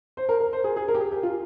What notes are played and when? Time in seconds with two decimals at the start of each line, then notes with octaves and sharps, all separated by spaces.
0.17 C5
0.29 A#4
0.40 A#4
0.53 C5
0.64 G#4
0.77 G#4
0.88 A#4
0.95 G4
1.00 G#4
1.12 G4
1.23 F4